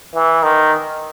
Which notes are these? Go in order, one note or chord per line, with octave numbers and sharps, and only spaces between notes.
E3
D#3